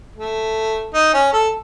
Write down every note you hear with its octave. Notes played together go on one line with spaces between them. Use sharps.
A3
D#4
C#4
A4